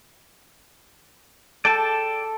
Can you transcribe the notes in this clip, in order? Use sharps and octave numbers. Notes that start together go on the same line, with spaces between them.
A4 D5 G5 A5